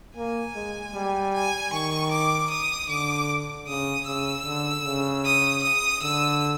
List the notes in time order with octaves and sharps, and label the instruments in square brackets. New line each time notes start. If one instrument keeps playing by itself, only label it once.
[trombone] A#3 [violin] G#5
[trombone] G#3
G3
[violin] G#5
[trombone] D#3 [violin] C#6
[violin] D6
D#6
[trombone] D3 [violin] D6
[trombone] C#3 [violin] D#6
[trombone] C#3 [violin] E6
[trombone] D3
C#3
[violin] D#6
D#6
[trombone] D3 [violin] E6